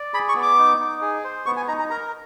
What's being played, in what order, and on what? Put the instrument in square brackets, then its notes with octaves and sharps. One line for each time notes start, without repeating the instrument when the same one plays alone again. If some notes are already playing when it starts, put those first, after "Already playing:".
Already playing: [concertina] D5
[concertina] G#4 [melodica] B5
[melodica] C#6
[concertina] B3
[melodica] D6
[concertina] D#4
D#4
G#4
C5
[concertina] B3 [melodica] C#6
[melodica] G#5
[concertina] D#4 [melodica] A#5
[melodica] A#5
[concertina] A#4 [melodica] A#5